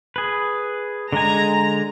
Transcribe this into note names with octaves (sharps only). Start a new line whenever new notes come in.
G#4 B4
D3 G#3 G#5 A#5